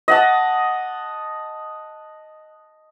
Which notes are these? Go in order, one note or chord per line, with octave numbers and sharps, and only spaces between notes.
D#5 F#5 A5